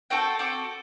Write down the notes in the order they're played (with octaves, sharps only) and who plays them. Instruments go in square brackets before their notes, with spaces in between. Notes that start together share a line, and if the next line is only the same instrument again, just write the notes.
[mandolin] C4 F#4 A4 G5
C4 F#4 A4 D6